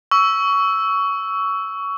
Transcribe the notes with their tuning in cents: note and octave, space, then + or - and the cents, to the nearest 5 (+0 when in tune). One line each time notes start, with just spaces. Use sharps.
C#6 +20 E6 +0